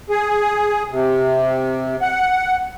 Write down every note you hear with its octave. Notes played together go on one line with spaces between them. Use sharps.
G#4
C3
F#5